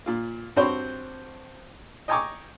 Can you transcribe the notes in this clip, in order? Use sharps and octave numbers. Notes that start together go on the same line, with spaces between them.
A#2 F4
G2 C4 F#4 C5 C#5 B5
D#5 G5 G#5 A#5 C#6 D6